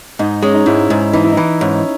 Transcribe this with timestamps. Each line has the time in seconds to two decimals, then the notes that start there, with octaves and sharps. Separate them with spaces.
0.19 G#2 D#4
0.42 G#3 C#4
0.54 D#4
0.66 G#2 E4
0.90 G#2
1.13 E3 D#4
1.24 E4
1.32 E3 D#4
1.61 G#2 C#4